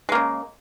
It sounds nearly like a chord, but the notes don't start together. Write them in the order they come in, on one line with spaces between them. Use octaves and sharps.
G#3 A#3 C#3